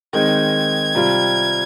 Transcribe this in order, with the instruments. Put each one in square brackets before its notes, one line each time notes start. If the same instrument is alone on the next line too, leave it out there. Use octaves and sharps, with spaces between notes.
[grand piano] D#3 G#3 C4 D#4 [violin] G#6
[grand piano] C3 G3 C4 F4